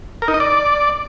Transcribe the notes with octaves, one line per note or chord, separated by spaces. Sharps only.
A#4
D#4
D#5
D5